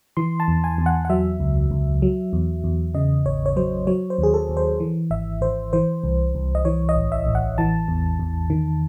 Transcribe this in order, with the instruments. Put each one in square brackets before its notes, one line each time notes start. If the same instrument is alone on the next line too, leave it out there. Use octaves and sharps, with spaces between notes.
[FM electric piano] E3 C6
A5
E2
G#5
E2
F#5
F#5
F#3 E5
C#2
C#2
F#3
E2
E2
C#3 D#5
G#1 C#5
C#5
F#3 C5
F#3 C#5
C5
D#2 G#4
A4
D#2
C5
E3
G#1 E5
G#1 C5
E3 C5
C2
C2
D#5
E3 C#5
D#5
A1
E5
A1
F#5
E3 A5
E2
E2
D#3